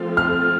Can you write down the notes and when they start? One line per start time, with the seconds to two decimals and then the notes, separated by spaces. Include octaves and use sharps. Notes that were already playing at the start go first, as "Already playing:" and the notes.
Already playing: F3 A3 C4 F4 A4
0.17 F6